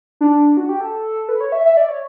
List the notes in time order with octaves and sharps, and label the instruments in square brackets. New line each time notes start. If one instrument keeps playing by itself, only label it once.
[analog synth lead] D4
F#4
G4
A4
B4
C#5
E5
E5
D5
C#5